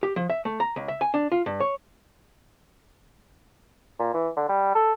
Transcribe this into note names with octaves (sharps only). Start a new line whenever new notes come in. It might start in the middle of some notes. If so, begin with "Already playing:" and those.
G4
F3
E5
A3
A#5
C#2
E5
G#5
D4
F4
G2
C#5
A#2
E3
D3
G3
A4